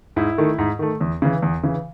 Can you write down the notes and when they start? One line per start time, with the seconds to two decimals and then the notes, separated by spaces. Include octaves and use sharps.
0.16 G#2 E4
0.38 D#3 A3
0.58 G#2
0.79 D#3 A3
1.01 E2
1.22 C#3 E3
1.42 E2
1.64 C#3 E3